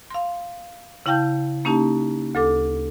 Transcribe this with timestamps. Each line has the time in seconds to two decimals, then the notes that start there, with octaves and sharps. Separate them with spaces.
0.10 F5 C6
1.06 C#3 E4 F5 G5 A5 G6
1.65 A#3 C#4 D#4 G4 A5
2.35 D2 A4 D6